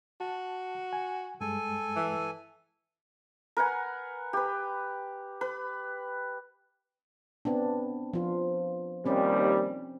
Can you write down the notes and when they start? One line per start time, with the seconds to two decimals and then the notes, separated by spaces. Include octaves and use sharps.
0.20 F#4 A5
0.93 G#5
1.41 G2 G#3 A4 G#5
1.96 E3
3.57 A#4 B4 F#5 G#5
4.33 G4 B4
5.41 B4
7.45 B3 C4 D4
8.13 F3 F4
9.05 D#2 G3 C4 C#4